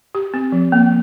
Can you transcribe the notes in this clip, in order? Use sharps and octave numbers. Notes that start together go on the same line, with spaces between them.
G4
C4
F3
A#3